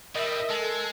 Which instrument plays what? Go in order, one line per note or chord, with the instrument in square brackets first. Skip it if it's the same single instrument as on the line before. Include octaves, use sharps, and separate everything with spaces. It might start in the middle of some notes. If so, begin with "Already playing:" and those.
[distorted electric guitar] A2 G3 [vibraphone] A#4 [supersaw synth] D#5 E5
[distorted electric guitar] G#3 [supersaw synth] A4